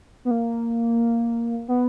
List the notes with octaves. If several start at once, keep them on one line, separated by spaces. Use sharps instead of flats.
B3
A#3
B3